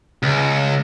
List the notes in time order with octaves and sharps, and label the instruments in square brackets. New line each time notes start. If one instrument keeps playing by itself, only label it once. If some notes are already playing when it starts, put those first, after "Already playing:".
[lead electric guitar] C#2